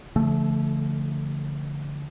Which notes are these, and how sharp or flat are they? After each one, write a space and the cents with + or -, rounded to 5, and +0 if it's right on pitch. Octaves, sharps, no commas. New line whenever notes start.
D3 -35 F3 -35 A3 +0